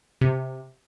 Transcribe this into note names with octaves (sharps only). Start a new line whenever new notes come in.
C3